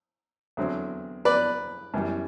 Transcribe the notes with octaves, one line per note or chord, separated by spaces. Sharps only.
E2 D3 F#3 C4
B4 D5
F#2 E3 G3